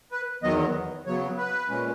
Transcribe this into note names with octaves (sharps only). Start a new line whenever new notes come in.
B4
E2 D#3 F#3 B3 D#5
C#3 F#3 B3 C#5
B4
A#2 G#3 C#4